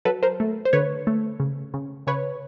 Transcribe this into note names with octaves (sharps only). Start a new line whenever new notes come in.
F#3 A4 B4
A#4 C5
A3
C5
D3 B4 C#5
A3
C#3
C#3
C#3 B4 C#5